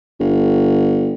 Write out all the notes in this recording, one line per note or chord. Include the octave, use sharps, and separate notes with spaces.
G1